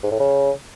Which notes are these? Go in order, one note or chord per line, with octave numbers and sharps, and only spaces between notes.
G#2
A2
C#3